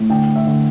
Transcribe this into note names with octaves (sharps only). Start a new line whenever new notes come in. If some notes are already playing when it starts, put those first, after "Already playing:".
Already playing: A2
D3 G5
E5
D3